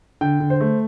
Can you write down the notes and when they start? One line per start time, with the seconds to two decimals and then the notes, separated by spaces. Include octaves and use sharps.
0.21 D3 G5
0.40 D3
0.50 C5
0.61 A3